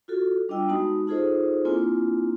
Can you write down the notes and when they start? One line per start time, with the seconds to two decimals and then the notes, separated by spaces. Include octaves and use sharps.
0.08 F4 F#4 A4
0.49 G3 D4 F4 D#5 G5 E6
0.68 G#3 B3 D#4 F#4 A5 D#6
1.07 D#4 F4 G#4 A4 C5 D#5
1.65 A#3 C4 D4 E4 F4 G#5